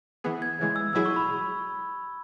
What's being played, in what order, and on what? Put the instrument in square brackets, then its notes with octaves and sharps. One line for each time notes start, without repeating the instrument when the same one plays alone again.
[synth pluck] E3 B3 G#4
[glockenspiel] G#6
[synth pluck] C#3 E3 G#3
[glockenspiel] E6
[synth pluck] B2 F#3 E4 G#4 [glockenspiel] E6
[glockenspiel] C#6
B5